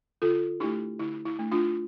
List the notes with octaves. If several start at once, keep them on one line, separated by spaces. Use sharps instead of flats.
D3 F4 A4
A3 D4 E4 G4
D3 E4
E4
A3 D4
D4 F4